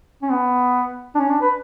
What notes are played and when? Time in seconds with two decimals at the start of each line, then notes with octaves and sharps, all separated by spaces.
0.23 C#4
0.31 B3
1.15 D4
1.19 C#4
1.30 D4
1.42 B4